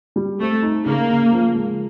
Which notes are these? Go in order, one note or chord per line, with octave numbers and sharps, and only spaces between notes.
G3
A3 C4
D#4
C#3 A#3
C#3
F3
G#3